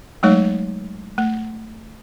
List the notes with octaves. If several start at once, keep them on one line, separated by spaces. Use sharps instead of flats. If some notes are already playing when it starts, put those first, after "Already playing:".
F#3 G#3 A3 D#4 C#5
A3